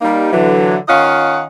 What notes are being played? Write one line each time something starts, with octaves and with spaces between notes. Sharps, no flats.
G3 A#3 D#4
D3 E3 F#3
D#3 C#4 F4 D#5 F5 F#5